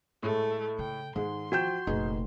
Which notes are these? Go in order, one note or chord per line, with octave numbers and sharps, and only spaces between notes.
A2 G#3 A3
C#3 G5
G#2 D#3 G#3 C6
F3 F#4 G5 G6 E7
F1 A#2 D#4 G#4 B4